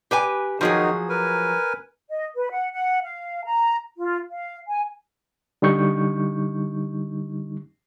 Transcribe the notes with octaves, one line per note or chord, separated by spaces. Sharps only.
G4 B4 G#5
D#3 F3 F#3 D#4 F#4 G#4
A#4 B4 G#5
D#5
B4
F#5
F#5
F5
A#5
F4
F5
G#5
D3 G3 D#4 C#6 G6